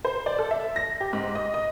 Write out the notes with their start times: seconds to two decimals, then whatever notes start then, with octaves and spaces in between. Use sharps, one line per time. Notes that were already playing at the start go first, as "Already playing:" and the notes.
0.05 C5
0.26 D5
0.39 A4
0.51 E5
0.76 A#6
1.01 G4
1.13 G#2
1.35 D#5
1.54 D#5